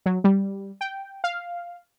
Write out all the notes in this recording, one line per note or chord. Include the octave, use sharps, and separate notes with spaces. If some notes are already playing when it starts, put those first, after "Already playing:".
F#3
G3
G5
F5